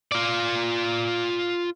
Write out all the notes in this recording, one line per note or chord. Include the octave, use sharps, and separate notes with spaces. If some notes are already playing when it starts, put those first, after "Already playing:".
F4 D5